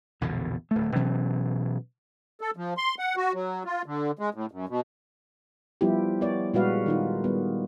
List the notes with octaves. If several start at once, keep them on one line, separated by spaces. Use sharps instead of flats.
A#1 E2 B2 D3
D1 A3
B2 E3 F#3 C#4
A4
F3
C6
F#5
F#4
F#3
F4
D3
G#3
A2
F#2
B2
F3 G3 B3 E4 F4 G4
B3 C#5 D5
A#2 G3 G#3 F#4 B4 F5
D#3 D#4 F4
G3 B3